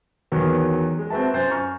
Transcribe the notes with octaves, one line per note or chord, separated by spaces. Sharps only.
E2 D#3 F#3 B3
G#3
C4 F#4 B4 E5 A5
F#2 C5 G#5 A6
G#5 A#5 C#6 F6